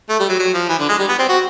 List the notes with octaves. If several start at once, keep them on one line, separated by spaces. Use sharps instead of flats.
A3
G3
F#3
F#3
F3
E3
D3
G#3
G3
B3
C4
F#4